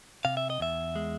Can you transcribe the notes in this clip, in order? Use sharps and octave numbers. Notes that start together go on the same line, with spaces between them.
C3 F5
E5
D#5
E2 E5
G#3